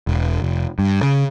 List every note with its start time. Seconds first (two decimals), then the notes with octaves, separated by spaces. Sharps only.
0.07 E1
0.42 F1
0.79 G2
1.03 C#3